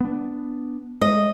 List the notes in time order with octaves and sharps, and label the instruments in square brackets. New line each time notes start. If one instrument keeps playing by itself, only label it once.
[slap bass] B3 D4
[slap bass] G#3 [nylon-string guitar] D#5